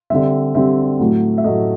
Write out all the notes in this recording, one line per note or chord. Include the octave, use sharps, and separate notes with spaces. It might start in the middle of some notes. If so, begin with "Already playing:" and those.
D3 G3 C4 E5
D3 G3 C4 E5
A2 F#3 A3
E5
A2 F#3 A3 D#5